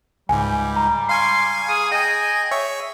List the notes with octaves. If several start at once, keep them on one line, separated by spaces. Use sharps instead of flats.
C#2 G#2 G3 G#5
A#5
F5 G#5 C6 C#6
G#4 D#6
G#4 D#5 G5 G#5
C#5 E5 C#6